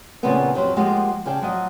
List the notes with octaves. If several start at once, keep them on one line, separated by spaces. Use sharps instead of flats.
A#2 C#3 E3 F3 B3 C4
F2 F#3 G4 C5
F3 G#3 A#3 F#4 G4 D#5
C#3 G#4 D5 G5 A5
F3 F#3 D#5